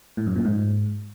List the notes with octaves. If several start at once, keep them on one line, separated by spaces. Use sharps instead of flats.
A2
F#2
A#2
G#2